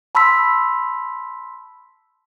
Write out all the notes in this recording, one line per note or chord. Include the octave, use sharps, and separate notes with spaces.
A5 B5 C6 E6 B6